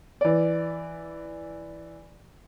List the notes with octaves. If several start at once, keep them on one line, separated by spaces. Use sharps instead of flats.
E3 D5